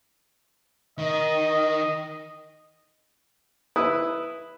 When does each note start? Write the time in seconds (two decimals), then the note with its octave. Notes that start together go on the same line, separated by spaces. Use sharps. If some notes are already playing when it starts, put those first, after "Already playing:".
0.99 D#3 D#5
3.76 E4 B4 D#6